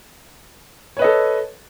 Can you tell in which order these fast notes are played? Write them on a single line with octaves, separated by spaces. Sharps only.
C#5 B4 D#5 A4